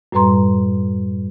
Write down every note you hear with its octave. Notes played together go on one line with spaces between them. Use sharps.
F#2 A2 G3 B4 A#5 C6